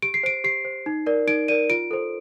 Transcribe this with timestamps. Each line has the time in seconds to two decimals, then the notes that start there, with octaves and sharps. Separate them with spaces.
0.02 G4 D7
0.14 C7
0.23 C5 D7
0.44 G4 C7
0.65 C5
0.86 D#4
1.06 A#4 D5
1.27 D#4 D7
1.48 A#4 D5 D#7
1.70 F4 D7
1.91 A4 C5